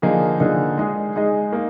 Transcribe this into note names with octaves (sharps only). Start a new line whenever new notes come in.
D3 F3 A#3 D#4 G#4
D3 F3 A#3 D#4 G#4
G#3 D#4 G#4 D#5
G#3 D#4 G#4 D#5
A#3 D#4